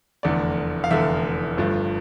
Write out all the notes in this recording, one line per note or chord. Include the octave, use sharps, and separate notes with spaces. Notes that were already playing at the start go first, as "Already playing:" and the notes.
F1 E2 D3 A3 D5
F5
F1 E2 D3 A3 E5
G1 G2 F3 A3